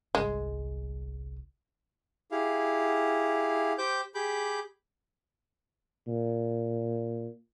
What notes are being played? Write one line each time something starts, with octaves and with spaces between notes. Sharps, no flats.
G1 C2 G#3
E4 G4 G#4 F5
G4 C5 G5 D6 G6
G4 G#4 B5 D6 G6
A#2